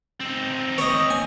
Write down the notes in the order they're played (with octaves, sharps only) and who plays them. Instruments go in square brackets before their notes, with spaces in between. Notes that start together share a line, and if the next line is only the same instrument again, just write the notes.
[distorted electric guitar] C4 D#4
[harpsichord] C#5 D#5
G#5